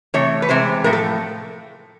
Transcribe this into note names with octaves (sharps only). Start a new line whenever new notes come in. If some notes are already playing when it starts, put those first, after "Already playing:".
C3 E3 A3 C#5
B4
C3 E3 G#3 C5
A2 F3 A3 A#4
A4